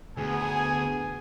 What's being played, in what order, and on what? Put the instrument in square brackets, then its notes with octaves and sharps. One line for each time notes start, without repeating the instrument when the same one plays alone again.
[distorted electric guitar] D2 [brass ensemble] B3 G#4 [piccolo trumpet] G#5